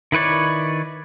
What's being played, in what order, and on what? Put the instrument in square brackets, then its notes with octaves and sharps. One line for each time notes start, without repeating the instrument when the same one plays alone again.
[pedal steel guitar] D#3 E4 B4 C#5 D5